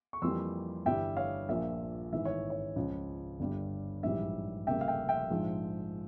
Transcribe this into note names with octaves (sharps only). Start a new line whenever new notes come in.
C#6
F2 E3 G3 A#3 C6 E6
G1 G2 E3 G3 E5 G5
C#5 F5
A#1 A#2 F3 A#3 E5
G#1 G#2 E3 E5
C#5
C#5
C#2 C#3 F3
G1 G2 G3
A#1 G#2 E3 G3 E5
F1 F2 C#3 G3 A#3 E5 G5
F5
E5 G5
E5 G5
A#1 G#2 F3 G#3